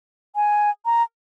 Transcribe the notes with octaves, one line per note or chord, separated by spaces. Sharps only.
G#5
A#5